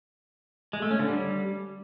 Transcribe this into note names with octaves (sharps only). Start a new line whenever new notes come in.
G#3
A3
C#4
D3
G3